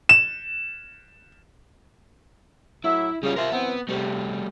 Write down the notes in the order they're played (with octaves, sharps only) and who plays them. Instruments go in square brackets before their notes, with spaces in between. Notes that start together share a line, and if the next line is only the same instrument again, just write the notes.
[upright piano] E7
[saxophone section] A2 F#3 E5 [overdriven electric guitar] E4
[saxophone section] C#3 [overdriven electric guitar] G3 F4
[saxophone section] C3 F4 [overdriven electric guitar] A#4 E5
[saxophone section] F#2 E3 C4 [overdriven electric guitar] B3
[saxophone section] C3 [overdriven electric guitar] G3 A3